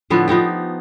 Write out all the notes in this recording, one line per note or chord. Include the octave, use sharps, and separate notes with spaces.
A2 D3 F3 B3
F3 B3 D#4 G4